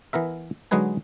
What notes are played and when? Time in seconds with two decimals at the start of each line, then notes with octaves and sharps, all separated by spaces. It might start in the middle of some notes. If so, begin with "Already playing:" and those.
0.13 E3 B3 A#4 E5
0.71 D3 F#3 G#3 D#4 B4 G#5